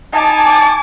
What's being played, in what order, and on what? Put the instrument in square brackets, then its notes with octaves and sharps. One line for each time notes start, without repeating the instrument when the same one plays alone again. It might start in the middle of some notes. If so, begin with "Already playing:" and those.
[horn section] D#4 A5 [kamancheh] G#5 D6